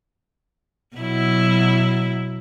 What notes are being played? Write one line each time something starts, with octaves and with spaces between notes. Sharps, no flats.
B2 F#3 E4